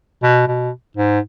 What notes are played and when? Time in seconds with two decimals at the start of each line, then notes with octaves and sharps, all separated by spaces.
0.23 B2
0.48 B2
0.97 G#2